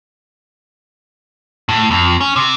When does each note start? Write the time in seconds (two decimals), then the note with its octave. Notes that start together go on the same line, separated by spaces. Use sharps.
1.69 A2
1.91 F2
2.21 C#4
2.36 C3